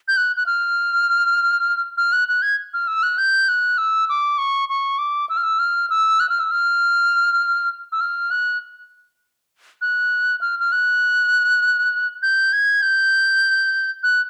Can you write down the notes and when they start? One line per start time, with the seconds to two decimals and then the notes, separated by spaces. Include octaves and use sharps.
0.08 G6
0.17 F#6
0.36 F#6
0.46 F6
1.98 F6
2.13 F#6
2.28 F#6
2.42 G#6
2.74 F6
2.87 E6
3.03 F#6
3.18 G6
3.48 F#6
3.78 E6
4.09 D6
4.38 C#6
4.69 C#6
4.98 D6
5.29 E6
5.37 F6
5.43 E6
5.59 F6
5.90 E6
6.20 F#6
6.29 F6
6.40 E6
6.51 F6
7.92 E6
8.01 F6
8.31 F#6
9.81 F#6
10.41 F6
10.60 F6
10.72 F#6
12.22 G6
12.53 G#6
12.82 G6
14.03 F#6